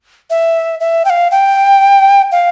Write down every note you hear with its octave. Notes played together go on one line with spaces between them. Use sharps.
E5
E5
G5
F5
G5
F5